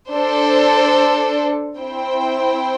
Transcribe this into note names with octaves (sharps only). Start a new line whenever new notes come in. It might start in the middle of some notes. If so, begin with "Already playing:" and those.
D4 A4 C5
C4 E4 C5 G5